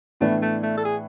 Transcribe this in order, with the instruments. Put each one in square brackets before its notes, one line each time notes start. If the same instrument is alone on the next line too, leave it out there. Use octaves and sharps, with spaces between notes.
[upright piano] A2 E3 B3 D4 [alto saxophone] A3
[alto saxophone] A3
A3
A4
G#4